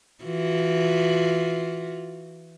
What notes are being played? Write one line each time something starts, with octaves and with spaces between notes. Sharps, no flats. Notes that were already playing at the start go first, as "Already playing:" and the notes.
E3 F4 F#4